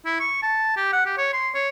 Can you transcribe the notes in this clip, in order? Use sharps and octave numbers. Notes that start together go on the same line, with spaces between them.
E4
C#6
A5
G4
F#5
G4
C#5
C6
C#5